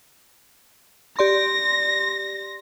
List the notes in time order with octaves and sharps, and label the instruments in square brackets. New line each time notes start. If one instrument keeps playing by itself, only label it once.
[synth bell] G4 D5 C6 [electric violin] A#6